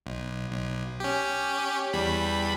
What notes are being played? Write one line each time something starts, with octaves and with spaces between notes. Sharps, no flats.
B1
B1
C#4 G4
E2 G3 B5